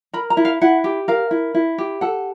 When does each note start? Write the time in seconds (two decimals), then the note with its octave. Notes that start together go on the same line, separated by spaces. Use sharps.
0.13 A#4 B5
0.30 A#5
0.37 E4
0.45 F5
0.61 E4 F#5
0.84 G4
1.08 A#4 F5
1.31 E4
1.55 E4
1.78 G4
2.01 A4 F#5